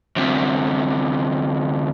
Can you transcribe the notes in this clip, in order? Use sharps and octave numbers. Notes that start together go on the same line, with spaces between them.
D2 C3